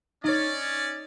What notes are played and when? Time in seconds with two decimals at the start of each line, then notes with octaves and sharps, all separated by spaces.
0.24 C#4 D#4 C#5 D5